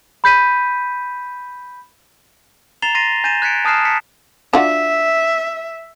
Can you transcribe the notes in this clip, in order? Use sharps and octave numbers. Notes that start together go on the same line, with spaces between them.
B5 G6 B6 D#7
A#5 A6 C7 E7 F7 G7
C6 A6 A#6 C7 D#7
G#5 G6 A6 A#6 D#7 E7
F#6 G#6 B6 C#7 D7
A5 D#6 F6 F#6 C7 E7
A5 B6 C#7
D4 F4 F#4 E5